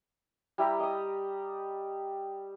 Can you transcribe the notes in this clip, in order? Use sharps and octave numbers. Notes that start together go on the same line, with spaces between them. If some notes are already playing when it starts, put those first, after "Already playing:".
G3 E4 G4 A#5
D#5 D#6